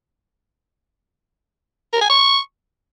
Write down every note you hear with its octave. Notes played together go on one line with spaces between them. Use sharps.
A#4
G#5
C#6